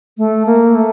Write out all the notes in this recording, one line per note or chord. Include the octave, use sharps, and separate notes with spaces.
A3
A#3
A3